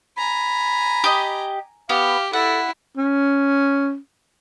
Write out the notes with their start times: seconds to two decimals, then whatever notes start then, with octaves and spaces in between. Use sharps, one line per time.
0.17 G#5 A#5 B5
1.04 G4 D#5
1.89 B3 G4 F5
2.33 E4 A4 F#5
2.97 C#4